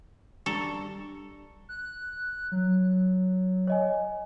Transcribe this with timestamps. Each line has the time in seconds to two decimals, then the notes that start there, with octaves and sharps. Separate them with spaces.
0.46 G3 D4 A4 A#5 C#6
1.69 F#6
2.52 F#3
3.67 C#5 D#5 G#5